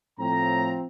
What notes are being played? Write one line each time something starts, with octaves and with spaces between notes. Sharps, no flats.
A2 F3 C4 A#5